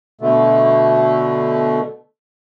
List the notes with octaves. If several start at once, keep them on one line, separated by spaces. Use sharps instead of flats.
B2 D3 A3